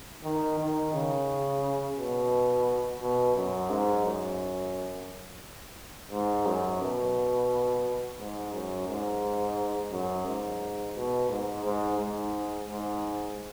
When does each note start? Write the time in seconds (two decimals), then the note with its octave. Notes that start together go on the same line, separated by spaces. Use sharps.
0.24 D#3
0.59 D#3
0.94 C#3
1.97 B2
3.00 B2
3.36 F#2
3.69 G#2
4.05 F#2
6.12 G#2
6.46 F#2
6.82 B2
8.19 G#2
8.54 F#2
8.88 G#2
9.92 F#2
10.27 G#2
10.96 B2
11.30 G#2
11.65 G#2
11.99 G#2
12.68 G#2